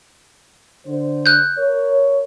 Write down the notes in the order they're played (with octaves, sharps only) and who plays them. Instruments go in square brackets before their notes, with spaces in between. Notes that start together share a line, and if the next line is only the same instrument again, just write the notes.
[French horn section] D3 C5
[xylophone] F#6 G6
[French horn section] A#4 C#5